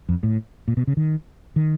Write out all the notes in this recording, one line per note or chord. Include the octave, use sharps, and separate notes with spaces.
F2
A2
A#2
B2
C#3
D#3
D#3